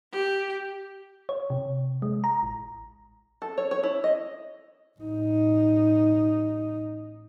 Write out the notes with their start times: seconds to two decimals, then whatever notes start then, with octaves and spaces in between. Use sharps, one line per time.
0.12 G4
1.29 C#5
1.50 C3
2.02 G#3
2.24 A#5
2.43 A1
3.42 A4
3.58 C#5
3.71 C#5
3.83 E4
4.04 D#5
5.00 A1 D#4